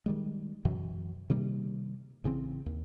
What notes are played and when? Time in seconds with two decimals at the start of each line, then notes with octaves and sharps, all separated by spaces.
0.06 D#3 G3 G#3
0.65 F#2 B2 E3 F#3
1.30 C3 D#3 G3 A#3
2.24 A1 C#3 E3 C4
2.66 D#2